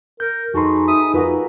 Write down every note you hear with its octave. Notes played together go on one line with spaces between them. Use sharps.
A#4 G6
F2 D#4 F#4 G#4 A4 B4 C6
E5 D#6
F2 A#3 F4 F#4 A#4 B4